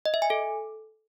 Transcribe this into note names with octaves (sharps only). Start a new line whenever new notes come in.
D#5
E5
G#5
A4